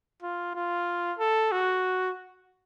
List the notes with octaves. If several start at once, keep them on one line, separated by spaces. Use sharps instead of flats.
F4
F4
A4
F#4